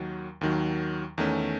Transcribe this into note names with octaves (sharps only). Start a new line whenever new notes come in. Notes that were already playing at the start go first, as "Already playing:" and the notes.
Already playing: D#2 D#3 F#3
D#2 D#3 F#3
E2 D#3 A3 C#4